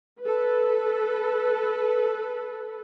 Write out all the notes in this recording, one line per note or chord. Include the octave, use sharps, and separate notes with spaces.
A4 B4